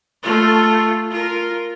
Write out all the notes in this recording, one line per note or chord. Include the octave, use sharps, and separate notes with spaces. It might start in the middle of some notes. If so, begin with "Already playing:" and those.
A3 F4
F4 A#4